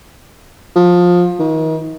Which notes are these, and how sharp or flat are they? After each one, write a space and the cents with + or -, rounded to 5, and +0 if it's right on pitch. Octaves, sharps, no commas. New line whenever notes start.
F3 +20
D#3 +40